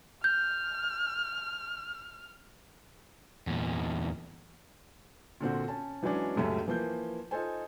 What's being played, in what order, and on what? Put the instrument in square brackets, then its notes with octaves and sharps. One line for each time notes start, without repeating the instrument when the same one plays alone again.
[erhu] F6 [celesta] G6
[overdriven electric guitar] E2 A#2
[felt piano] A#2 D3 C4 F#4
C#4 A5
E3 F#3 G#3 C#4 D4
D#1 C#2 F#2 A3 C#4
E3 F3 A#3 G6
D#4 F4 A4 C5 G#5